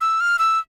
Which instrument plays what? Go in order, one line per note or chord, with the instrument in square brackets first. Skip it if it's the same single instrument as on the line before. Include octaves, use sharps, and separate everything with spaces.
[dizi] E6
F6
E6